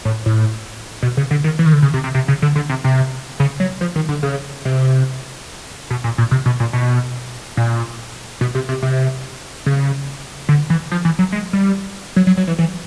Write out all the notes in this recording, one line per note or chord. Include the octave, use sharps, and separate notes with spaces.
A2
A2
B2
C#3
D3
D#3
E3
D#3
D3
C#3
C3
C3
C3
C#3
D3
D3
C3
C3
C#3
F#3
F3
D#3
D3
C#3
C3
B2
A#2
A#2
C3
B2
A#2
B2
A#2
B2
C3
C3
C3
C#3
D3
E3
F3
E3
F#3
G#3
G3
F#3
F#3
F#3
E3
E3